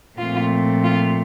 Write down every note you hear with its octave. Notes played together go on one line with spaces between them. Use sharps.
A#2 F3 A3 C4 F4
F4